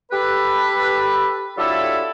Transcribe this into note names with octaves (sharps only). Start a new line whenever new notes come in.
G4 A4 B4
F#3 D4 E4 F4 G4 A4